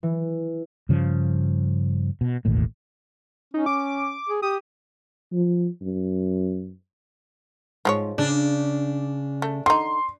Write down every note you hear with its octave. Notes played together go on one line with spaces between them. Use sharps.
E3
G2 C#3 F3
B2
E1 A1 D#2 A2
C#4 D#4
D6
G#4
G4 D#6
F3
F#2
G#2 F3 G#3 C#5
C#3 D4
A3
D3 D#4 C6